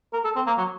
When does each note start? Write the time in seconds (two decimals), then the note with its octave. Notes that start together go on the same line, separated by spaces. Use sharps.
0.13 A#4
0.24 A4
0.36 C4
0.47 A#3
0.58 F#3